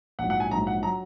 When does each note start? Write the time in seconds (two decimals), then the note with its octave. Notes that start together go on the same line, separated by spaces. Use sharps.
0.19 A#1 G#2 F#3 F#5
0.30 F#5
0.40 G#5
0.51 A#1 G#2 F#3 A#5
0.67 F#5
0.83 F#3 A#5